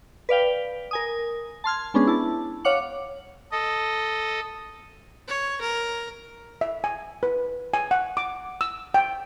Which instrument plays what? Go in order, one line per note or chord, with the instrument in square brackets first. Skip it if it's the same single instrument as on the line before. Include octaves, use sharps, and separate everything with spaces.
[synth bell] B4 D5 F5 G5
A#4 G#5 D#6
A5 C6 F6 G#6
G#3 B3 C#4 D4 G#4
E4 A5
C#5 F5 F#5 D6 C#7 F#7
[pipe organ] A4 D#5
[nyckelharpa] C#5
A#4
[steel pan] E5
G#5
B4
G#5
F#5
D6
E6
G5